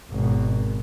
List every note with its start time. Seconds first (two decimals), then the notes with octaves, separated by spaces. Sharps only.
0.11 G#1 B2